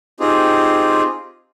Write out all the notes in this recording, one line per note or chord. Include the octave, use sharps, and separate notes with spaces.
C4 D#4 F4 G4 G#4